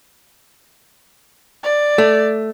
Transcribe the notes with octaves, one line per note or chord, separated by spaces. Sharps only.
D5
A3